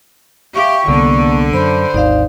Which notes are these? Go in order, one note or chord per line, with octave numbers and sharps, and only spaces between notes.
G4 E5 F5 C#6 D6
C2 D3 A#3 B3
F#2 C5 B5
G#1 D#2 D#4 D5 F5